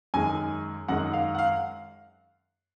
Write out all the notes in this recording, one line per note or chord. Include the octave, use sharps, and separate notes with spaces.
F#2 D#3 G#3 G#5
F#2 D#3 G#3 F#5
F5
F#5
F5